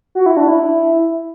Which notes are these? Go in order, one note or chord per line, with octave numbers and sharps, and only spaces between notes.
F#4
E4
D4
E4